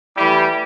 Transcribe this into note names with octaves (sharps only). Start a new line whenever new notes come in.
E3 G3 A3 E4 G4